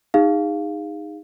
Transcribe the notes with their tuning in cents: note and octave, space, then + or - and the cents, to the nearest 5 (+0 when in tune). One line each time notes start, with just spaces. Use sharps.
D#4 +0 G#4 -30 F5 +0